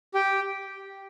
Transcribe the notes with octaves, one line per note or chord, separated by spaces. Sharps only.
G4 G5